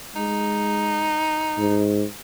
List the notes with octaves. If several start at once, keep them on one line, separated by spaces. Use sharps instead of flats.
G#3 D#4
G#2